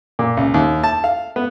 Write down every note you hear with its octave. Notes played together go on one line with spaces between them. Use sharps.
A#2
C#2
D#2
A5
F5
B3